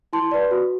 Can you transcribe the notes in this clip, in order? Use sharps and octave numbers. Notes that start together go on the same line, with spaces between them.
E4 A5 C6
B4 D5
F#4